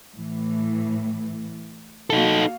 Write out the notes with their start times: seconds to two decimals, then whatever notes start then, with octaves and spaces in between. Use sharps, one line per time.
0.14 A2 E3
2.10 A#3 D#4 F#4 A4 F5